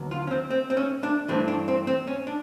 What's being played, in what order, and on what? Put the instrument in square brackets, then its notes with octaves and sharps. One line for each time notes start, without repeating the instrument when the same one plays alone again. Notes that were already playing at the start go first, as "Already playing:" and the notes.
Already playing: [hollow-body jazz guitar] D#2 D3 F#3 B3
F4
C#4
C4
C4
C4
C#4
D4
G2 E3 A3 C4 D4
D4
C4
C4
C#4
D4